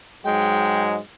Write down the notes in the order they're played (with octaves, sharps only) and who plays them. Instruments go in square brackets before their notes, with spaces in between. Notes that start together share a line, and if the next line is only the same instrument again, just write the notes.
[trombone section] G#2 F#3 G#3 [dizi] G5